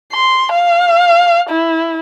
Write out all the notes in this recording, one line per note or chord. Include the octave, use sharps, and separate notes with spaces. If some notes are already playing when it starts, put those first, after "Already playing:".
C6
F5
E4